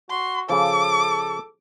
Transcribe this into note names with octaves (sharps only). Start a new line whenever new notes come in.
F#4 C6
C#3 F3 A4 D6